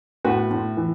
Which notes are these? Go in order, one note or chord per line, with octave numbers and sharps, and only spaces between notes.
A2 F#4 B4
A2
E3